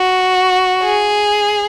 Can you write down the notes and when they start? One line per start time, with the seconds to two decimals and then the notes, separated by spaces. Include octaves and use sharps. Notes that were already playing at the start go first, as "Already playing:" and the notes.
Already playing: F#4
0.84 G#4